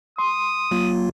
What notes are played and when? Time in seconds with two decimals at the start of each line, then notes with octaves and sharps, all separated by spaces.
0.18 C6 D#6
0.71 F#3 A#3 F4